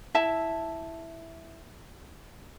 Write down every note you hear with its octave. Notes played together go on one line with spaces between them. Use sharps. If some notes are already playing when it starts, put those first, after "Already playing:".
E4 E5 A5